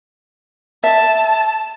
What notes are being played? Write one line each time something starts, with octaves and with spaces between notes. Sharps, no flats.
E5 A5